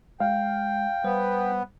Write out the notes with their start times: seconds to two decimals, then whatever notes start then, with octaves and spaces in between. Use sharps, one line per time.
0.20 G#3 F5 G5
1.04 G3 B3 C5